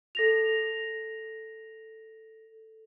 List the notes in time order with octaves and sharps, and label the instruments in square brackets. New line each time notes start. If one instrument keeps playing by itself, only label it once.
[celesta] A4 A#6 F7